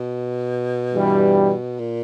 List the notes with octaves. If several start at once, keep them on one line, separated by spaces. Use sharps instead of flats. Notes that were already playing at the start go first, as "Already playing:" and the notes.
Already playing: B2
G2 E3 G3
A#2